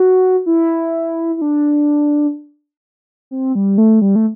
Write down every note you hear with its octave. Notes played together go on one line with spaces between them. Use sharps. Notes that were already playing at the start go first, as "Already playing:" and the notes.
Already playing: F#4
E4
E4
D4
C4
G3
A3
G3
A3